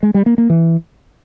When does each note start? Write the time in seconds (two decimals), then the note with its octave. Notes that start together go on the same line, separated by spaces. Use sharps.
0.03 G#3
0.14 G3
0.26 A#3
0.38 A#3
0.50 E3